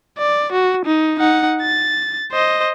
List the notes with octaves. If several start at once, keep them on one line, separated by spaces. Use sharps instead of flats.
D5
F#4
D#4
D#4 F#5
A6
C5 D#5